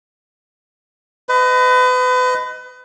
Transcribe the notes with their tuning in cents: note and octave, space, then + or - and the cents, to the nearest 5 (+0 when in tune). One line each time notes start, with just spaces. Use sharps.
B4 +35 D#5 +0